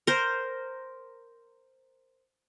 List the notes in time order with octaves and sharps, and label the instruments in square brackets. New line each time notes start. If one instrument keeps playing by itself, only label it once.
[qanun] A#4 C5